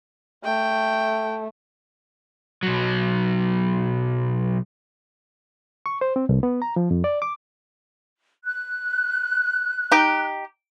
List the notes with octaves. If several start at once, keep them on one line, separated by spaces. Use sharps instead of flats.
A3 G5
B1 F#3
C#6
C5
C4
C2
B3
A#5
F3
F2
D5
D6
F#6
D#4 G4